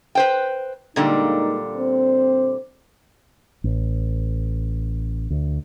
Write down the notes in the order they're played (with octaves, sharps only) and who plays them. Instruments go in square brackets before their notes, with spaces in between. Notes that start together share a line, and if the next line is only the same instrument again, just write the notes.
[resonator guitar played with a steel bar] B4 C5 G5
[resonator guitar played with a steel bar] A#2 D3 G3 [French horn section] G#3 A#3 D#4
[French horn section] C4 C5
[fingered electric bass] A1
D2